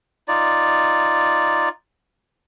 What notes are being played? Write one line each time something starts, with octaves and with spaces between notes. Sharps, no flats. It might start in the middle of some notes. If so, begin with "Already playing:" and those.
D#4 F4 D5